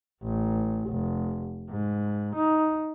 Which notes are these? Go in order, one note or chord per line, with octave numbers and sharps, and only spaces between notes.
A1
F1
G#2
D#4